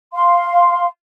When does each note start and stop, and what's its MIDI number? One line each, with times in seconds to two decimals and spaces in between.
0.13 0.85 77
0.13 0.85 84